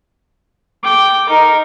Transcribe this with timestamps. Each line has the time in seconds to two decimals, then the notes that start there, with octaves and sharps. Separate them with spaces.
0.83 G5 D6
1.29 D#4 A#4